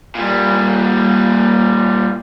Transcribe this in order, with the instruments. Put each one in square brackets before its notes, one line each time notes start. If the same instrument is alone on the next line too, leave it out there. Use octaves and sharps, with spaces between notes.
[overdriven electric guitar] A#2 G3